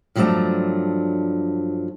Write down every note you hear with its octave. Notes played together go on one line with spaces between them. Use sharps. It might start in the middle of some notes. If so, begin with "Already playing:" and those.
G2 F3 F#3 A3 D4 A5